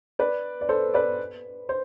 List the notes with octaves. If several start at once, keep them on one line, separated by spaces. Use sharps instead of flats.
B4 D5
D5
A4 C5
B4 D5
C5